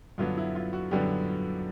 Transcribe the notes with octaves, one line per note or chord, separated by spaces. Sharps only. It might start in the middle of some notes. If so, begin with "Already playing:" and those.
F#2 D3 F#3 B3 D4 F4
E4
F4
F#4
F#2 D3 F#3 B3 D4 G4